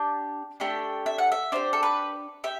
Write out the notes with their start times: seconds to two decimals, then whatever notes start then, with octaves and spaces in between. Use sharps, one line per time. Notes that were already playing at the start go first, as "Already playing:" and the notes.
Already playing: D4 G4 A5
0.60 A3 D4 G4 G5
1.06 E5
1.18 F#5
1.32 E5
1.52 D4 G4 C5
1.73 A4
1.83 B4
2.44 G4 E5